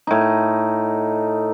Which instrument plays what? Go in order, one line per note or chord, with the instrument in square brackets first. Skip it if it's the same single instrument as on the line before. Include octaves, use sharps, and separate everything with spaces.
[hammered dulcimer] A2 D#4